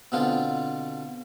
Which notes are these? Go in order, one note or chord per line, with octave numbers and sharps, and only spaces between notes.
B2 D3 B3 C4 F4